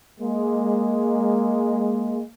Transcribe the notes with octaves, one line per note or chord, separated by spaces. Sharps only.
G#3 A#3